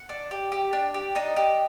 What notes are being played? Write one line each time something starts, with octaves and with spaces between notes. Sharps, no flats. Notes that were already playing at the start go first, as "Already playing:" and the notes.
Already playing: F#5
D4
G4
G4
D4
G4
D4 D#4 D#5
G4